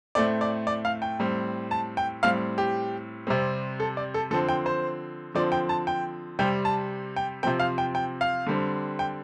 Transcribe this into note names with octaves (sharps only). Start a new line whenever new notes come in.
A2 A3 C4 D5
D5
D5
F5
G5
A2 G3 C4
A5
G5
A2 G3 C4 F5
G4
C3 G3 C4
A4
D5
A4
D3 F3 C4 A4
G5
C5
D3 F3 C4 D5
G5
A5
G5
C3 G3 C4 G5
A5
G5
C3 F3 C4 G5
F5
G5
G5
F5
D3 G3 C4
G5